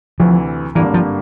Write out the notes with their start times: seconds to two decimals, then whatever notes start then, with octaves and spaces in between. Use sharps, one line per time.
0.19 D2 C3 E3 F3
0.75 G#1 G2 D3 E3 G3 A#3
0.94 F3